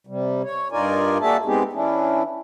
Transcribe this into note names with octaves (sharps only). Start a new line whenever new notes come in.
C3 G3
C#5
G2 D#4 F4 A#4 D5 G#5
A#3 D4 F#4 G#4 E5 A5
G#3 B3 C4 D#4 G4 G#4
E3 C#4 D4 E4